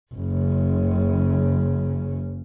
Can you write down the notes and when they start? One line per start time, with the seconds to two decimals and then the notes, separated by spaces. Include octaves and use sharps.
0.14 F#1 C#3